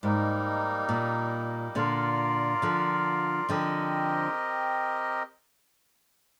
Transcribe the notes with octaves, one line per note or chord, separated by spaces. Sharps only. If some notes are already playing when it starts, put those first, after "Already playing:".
G#2 G3 A#3 D#4
A#2
A#2 D3 F4 A#4 D5 F5
D3 F3
D3 F3 C4 G4 A#4 D#5